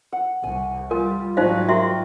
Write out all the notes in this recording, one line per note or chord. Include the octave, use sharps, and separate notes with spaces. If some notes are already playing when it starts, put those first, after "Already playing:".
F#5
C2 G#5
G3 F4 A#4
G#2 F#3 G3 D#4 C5 D#5 F5
F#4 G4 A#4 E5 G5 C6